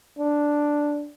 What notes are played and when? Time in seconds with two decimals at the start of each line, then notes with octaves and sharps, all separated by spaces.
0.19 D4